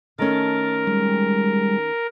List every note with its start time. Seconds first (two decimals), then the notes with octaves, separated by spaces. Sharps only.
0.19 D#3 A3 C#4 A#4 A5
0.87 G3 G#3